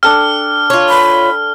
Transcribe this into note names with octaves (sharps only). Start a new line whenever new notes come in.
D4 A4 G5 F6
F4 C#5
B5